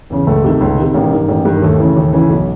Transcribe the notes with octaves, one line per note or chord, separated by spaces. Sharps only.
E2 C#3
C#2 A3
C3 D#3
C#2
C3 D#3
A1 A#3
G2 D#3
A1
G2 D#3
A#3
D#2 A3
C#3 E3
D#2
C#3 E3
B1